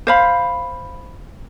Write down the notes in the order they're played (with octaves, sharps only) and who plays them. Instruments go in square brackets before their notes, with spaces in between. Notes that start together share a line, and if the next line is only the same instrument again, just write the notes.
[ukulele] C5 F5 B5